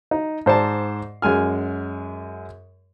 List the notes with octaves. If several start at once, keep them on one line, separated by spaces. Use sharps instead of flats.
D#4
G#2 C5 D5 A5
F#2 G#3 G#5 F6